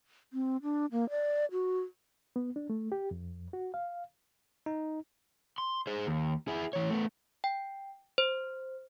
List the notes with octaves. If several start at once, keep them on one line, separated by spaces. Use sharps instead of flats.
C4
D4
A#3
D5
F#4
B3
D4
A3
G4
F2
F#4
F5
D#4
C6
G#4 C5
D#2
E4 G#4
E3 C#5
A3 B3
G5
C5